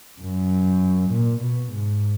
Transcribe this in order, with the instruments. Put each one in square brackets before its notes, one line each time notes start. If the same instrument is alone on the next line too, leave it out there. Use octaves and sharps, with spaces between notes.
[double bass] F#2
A#2
B2
G#2